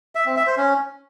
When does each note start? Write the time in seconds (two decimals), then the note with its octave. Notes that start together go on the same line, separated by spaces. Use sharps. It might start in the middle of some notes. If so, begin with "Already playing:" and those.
0.15 E5
0.26 C4
0.36 E5
0.47 C5
0.57 C#4